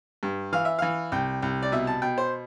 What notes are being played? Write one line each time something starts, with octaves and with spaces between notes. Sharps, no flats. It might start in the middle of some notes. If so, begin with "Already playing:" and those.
G2
E3 F5
E5
E3 F5
C2 G5
C2
D5
B2 E5
A5
B2 G5
C5